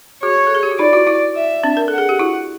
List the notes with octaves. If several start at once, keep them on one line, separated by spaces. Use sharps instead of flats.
F#4 G#4 C#5
A4
G#4
G4
F#4
D#4 F4 D5
E4 F#4
E4 F#4
E5
C4 D4
A#4
A4 F#5
G#4
G4
E4 F#4